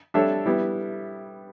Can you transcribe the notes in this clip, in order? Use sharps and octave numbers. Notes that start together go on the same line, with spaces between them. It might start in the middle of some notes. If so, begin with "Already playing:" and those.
G3 D4 A4 C#5 E5
G3 B3 E4